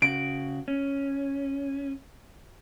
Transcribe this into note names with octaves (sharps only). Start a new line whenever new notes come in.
C#3 F#4 D7
C#4